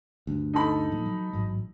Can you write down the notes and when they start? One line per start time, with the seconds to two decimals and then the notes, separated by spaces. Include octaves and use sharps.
0.27 D2 G2
0.53 D#4 A4 B5
0.92 A#2 F3
1.06 F#3
1.33 A1 G#2 F#3